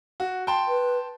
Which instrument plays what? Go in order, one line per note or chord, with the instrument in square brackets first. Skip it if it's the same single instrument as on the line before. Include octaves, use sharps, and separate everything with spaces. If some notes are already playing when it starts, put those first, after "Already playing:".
[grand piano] F#4
G5 A5 C6
[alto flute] B4